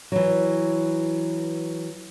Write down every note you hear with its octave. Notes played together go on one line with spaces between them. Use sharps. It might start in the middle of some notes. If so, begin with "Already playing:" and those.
E3 F#3